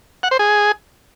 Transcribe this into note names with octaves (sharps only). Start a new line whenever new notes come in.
F#5
C5
G#4